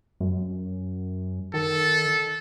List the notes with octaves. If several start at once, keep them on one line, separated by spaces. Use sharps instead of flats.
F#2
D#3 A4